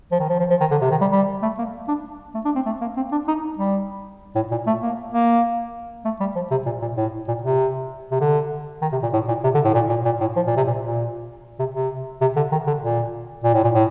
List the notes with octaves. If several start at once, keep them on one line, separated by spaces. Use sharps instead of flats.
F3
D#3
F3
F3
F3
D#3
D3
C3
D#3
G3
G3
A3
A#3
D4
A3
D4
C4
A3
A#3
C4
D4
D#4
G3
A2
A#2
A3
A#3
A#3
A3
G3
F3
C3
A#2
A#2
A2
A#2
C3
C3
D3
D#3
C3
A#2
A2
A#2
C3
D3
A2
A#2
A#2
A#2
A2
F3
A#2
C3
A#2
A#2
C3
C3
C3
D3
D#3
D3
A#2
A#2
A2
A#2
A2